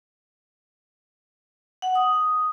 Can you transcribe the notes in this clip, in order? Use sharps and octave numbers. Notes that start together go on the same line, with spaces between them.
F#5
D#6